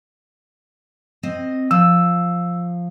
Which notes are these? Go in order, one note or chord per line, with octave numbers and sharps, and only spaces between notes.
C4 D#5
F3 E6